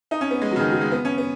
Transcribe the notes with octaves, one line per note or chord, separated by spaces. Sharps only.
D#4
C#4
B3
G#3
F#3
C#3
D#3
F#3
G#3
B3
C#4
B3